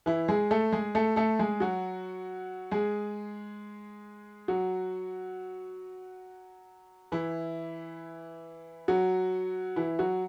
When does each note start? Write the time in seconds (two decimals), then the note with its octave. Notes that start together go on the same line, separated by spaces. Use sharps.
0.06 E3 E4
0.28 G#3 G#4
0.51 A3 A4
0.73 G#3 G#4
0.95 A3 A4
1.16 A3 A4
1.39 G#3 G#4
1.60 F#3 F#4
2.71 G#3 G#4
4.48 F#3 F#4
7.12 E3 E4
8.88 F#3 F#4
9.76 E3 E4
9.99 F#3 F#4